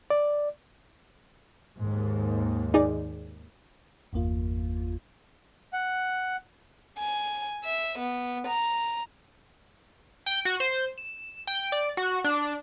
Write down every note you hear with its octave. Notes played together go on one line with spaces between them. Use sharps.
D5
D#2 G#2
D#4 G#4 D5
G1 E2 A#3 F4
F#5
G#5
E5
B3
A#5
G5
F#4
C5
E7
G5
D5
F#4
D4